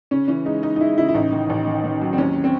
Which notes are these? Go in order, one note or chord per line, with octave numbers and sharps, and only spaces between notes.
C#3 C#4
E3 C#4
G#3 D#4
G#3 D#4
D#4
G#3 E4
C#3 E4
E4
A1 D#4
D#3
A1
D#3
D#3
F#3
C4
D#2 C#4
C4